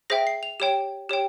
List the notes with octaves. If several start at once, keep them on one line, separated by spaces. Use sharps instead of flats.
G#4 C5 E5 G5 A#6
C7
F7
G4 C#5 G5 E7
G4 C#5 G5